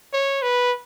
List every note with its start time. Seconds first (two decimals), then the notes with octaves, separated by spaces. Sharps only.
0.13 C#5
0.43 B4